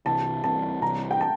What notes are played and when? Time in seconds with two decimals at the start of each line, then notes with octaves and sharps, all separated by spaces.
0.06 C2 C3 E3 A5
0.43 C2 C3 E3 A5
0.82 C2 C3 E3 A#5
1.11 G5
1.21 A5